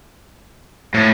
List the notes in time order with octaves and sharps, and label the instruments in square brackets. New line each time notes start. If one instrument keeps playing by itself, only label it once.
[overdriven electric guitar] A2